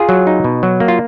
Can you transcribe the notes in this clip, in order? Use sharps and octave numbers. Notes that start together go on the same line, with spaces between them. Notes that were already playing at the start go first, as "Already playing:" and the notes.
Already playing: F4 G#4
F#3
D#4
B2
F#3
A#3
F4